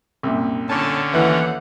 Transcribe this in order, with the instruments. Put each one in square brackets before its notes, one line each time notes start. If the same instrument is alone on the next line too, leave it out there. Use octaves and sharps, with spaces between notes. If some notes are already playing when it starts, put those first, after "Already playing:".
[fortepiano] C2 F#2 A#2
[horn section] A2 G#5 A5 [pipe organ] D3 C#4
[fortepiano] D#2 [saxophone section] E3 [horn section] F#3 A3 F#5